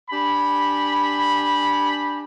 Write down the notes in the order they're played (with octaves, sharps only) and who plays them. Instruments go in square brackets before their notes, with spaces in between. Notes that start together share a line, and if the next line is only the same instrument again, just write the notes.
[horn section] D4 G4 G#5 B5